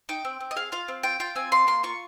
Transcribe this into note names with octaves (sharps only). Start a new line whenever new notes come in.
D#4 G5
C4
C4
D#5
G#4 F5
F4 F5
C4
F4 G5
F4 G5
C4 G#5
F4 C6
A#3 C6
F4 C#6